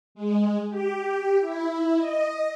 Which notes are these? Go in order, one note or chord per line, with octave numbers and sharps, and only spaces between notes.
G#3
G4
E4
D#5